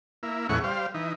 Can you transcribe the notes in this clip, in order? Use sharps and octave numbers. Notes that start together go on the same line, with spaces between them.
A#3 E4
E2 A2 C#3 G#3 F#5 C#6
G3 C5 F5
E3 D#4